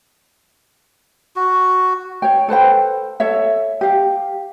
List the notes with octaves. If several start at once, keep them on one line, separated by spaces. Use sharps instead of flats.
F#4
C#5 G5
A4 B4 C5 G5
A4 C#5 E5
G4 F5